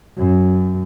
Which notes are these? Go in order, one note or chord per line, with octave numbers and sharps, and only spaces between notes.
F#2